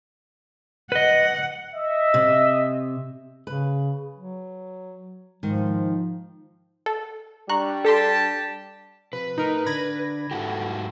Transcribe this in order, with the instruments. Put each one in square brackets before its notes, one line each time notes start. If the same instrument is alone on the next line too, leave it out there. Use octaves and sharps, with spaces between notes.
[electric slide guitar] B4 D#5 [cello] F#5
[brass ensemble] D#5 E5
[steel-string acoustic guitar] C3
[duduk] C#3 [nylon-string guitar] B4
[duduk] F#3
[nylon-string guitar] G#2 D#3 [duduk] F3
[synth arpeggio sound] A4
[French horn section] G3 D4 [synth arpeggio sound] A#5 C#6 F#6
[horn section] G4 A5 [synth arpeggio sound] A4 C6
[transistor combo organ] C3 F3 [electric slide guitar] B4
[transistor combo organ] A2 [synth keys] D#4 A#4
[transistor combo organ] D3 D4 [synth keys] B5 G#6 A#6
[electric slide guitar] G#2 F#4 G4 [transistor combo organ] E4 A4